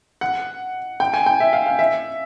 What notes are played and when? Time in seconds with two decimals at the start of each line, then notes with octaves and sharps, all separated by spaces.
0.21 F#5
1.00 G5
1.14 G#5
1.26 G5
1.40 E5
1.53 F5
1.66 F5
1.79 E5